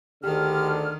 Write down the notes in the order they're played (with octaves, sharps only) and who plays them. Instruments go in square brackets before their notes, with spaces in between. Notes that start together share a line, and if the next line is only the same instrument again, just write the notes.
[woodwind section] D2 G#4 F6 [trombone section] D3 [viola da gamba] D#3 [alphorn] G4